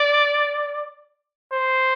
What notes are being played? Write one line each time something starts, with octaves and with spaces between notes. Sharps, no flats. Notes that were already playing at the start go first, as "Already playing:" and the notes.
Already playing: D5
C5